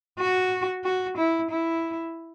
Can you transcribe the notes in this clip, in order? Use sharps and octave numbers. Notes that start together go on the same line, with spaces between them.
F#4
F#4
E4
E4